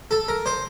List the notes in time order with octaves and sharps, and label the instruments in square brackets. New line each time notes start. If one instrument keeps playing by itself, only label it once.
[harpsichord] A4
A#4
C5